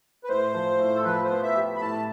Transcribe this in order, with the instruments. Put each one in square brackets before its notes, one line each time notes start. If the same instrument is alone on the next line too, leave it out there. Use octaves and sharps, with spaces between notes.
[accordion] B4
[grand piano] A2 [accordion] C5
[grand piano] F3
A2
[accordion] A4
[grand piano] F3 [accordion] B4
[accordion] C5
[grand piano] B3
[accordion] E5
[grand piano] G4
[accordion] B5
[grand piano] A2 [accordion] A5